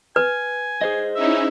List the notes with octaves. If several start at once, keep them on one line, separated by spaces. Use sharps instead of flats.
B4 G#5
G#4 C5 D#5
C#4 D#4 E4 E5